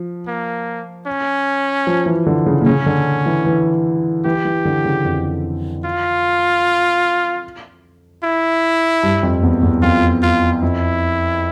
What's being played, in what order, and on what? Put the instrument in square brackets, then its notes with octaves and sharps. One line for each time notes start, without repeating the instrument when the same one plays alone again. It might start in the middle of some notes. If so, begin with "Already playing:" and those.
Already playing: [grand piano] F3
[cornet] A#3
C#4
[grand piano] F3
E3
D3
C#3
A#2
[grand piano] C#3 [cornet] C#4
[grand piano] D3
E3
E3
[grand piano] E3 [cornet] G4
[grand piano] E3
D3
C#3
F2
[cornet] F4
E4
[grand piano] G2
F2
E2
E2
[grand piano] F2 [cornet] F4
[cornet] F4
[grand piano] F2 [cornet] E4